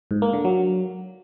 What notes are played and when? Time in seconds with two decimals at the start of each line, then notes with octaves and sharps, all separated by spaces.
0.11 G#2
0.22 A#3
0.33 D3
0.45 F#3